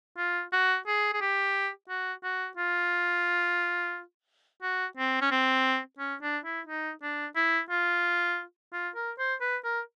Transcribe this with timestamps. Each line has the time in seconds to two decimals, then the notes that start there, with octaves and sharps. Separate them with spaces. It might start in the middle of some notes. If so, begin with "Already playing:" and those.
0.18 F4
0.52 F#4
0.86 G#4
1.13 G#4
1.21 G4
1.89 F#4
2.23 F#4
2.57 F4
4.62 F#4
4.97 C4
5.21 C#4
5.31 C4
5.99 C#4
6.22 D4
6.45 E4
6.67 D#4
7.02 D4
7.36 E4
7.70 F4
8.73 F4
8.95 A#4
9.19 C5
9.41 B4
9.64 A#4